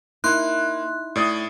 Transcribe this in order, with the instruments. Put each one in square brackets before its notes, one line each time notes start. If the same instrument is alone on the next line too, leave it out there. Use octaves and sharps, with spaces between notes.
[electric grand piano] A#3 [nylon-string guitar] D#4 E4 [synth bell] C6 F#6
[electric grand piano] A2 D5 D#6